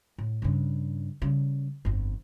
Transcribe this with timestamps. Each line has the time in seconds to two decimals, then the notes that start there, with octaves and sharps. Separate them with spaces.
0.18 A2
0.42 G2 C#3
1.22 C#3 G3
1.85 G1 F2